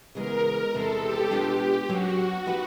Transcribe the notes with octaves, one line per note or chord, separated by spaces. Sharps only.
C#3 E3 G#3 B3 A#4
E2 C3 E3 G#3 A4
G4
B2 G#3 B3 D4 F4
F#3 A#3 C#4 F#4
F3 A#3 D#4 G4 B4